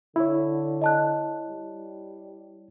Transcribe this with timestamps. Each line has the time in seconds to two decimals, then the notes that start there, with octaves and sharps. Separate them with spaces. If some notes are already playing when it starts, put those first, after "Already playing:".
0.16 D3 E4 C#5
0.82 D#5 A5 F#6
1.49 G3